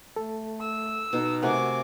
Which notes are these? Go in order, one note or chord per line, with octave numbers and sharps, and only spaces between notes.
A3 A4
E6
B2 D#4
C3 A3 F#4 A#4 F#5 G#5 D6